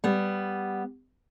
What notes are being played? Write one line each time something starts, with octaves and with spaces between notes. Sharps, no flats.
G3 B3